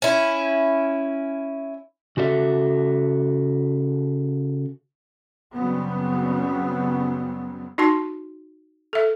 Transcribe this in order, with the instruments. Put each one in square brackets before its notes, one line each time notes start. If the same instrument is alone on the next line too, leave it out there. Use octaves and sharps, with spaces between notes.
[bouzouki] C#4 E4
[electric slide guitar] C#3 F#4 A4 D#5 E5
[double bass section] F#2 C#3 F#3 G3 B3 C4
[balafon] D#4 F#4 A5 C6
A4 E5